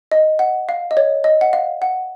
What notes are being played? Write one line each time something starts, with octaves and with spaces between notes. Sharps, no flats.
D#5
F#5
F5
D#5
C#5
D#5
F#5
F5
F#5